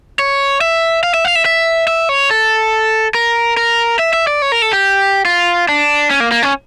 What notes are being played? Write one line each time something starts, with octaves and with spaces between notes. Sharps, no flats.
C#5
E5
F5
E5
F5
E5
E5
E5
C#5
A4
A#4
A#4
E5
E5
D5
C#5
A#4
A4
G4
F4
D4
C#4
A#3
A#3
C#4